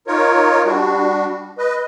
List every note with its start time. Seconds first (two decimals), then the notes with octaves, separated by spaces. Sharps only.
0.07 D#4 F4 A#4 C#5
0.65 G3 D4 F#4
1.58 B4 D#5